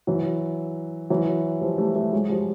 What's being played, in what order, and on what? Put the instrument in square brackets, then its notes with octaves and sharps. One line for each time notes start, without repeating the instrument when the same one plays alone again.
[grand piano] E3 F#3
E3 F#3
F3 G3
G3 A3
G3 A3
F#3 G#3
F3 G3